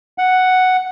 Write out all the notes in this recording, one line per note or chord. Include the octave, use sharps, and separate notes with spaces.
F#5